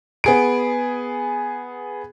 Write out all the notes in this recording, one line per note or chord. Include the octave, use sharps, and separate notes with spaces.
B3 G#4 D7